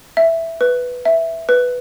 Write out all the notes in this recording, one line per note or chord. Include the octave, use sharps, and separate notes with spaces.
E5
B4
E5
B4